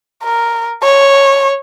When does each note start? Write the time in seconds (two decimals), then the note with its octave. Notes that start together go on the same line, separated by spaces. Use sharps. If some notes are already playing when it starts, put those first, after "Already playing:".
0.24 A#4
0.83 C#5